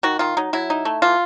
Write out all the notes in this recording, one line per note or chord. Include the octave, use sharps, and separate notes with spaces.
D#3 F#4
D#3 F4
F#3 D#4
F#3 E4
D#4
A3
E3 F4